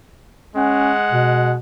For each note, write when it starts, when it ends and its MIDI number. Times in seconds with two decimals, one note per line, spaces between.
0.56 1.55 56
0.56 0.92 61
0.56 1.55 78
1.12 1.57 47